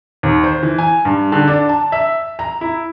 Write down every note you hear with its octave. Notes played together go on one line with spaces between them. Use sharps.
D#2
C5
E3
G#5
G2
D3
D4
A5
E5
A#5
E4